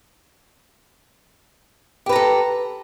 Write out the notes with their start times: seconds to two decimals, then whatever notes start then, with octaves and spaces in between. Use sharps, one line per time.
2.06 G4
2.09 B4
2.12 A#5
2.16 A4